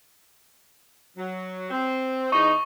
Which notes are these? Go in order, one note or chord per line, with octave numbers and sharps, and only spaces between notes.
F#3
C4
E2 D#4 C#6